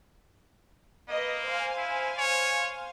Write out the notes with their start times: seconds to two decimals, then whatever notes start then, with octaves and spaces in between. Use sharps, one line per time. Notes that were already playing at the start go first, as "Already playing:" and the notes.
1.09 A#3 B4 D#5
1.46 C5 F5 G#5
1.78 E4
2.18 C#5